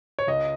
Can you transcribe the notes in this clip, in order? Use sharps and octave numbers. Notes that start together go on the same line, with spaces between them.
C#5
C#2 D#5